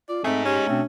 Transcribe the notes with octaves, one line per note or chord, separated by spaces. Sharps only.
F4 D5
A3 C4 D#4 G#4
C#4 G4
B2 A3 C4 D4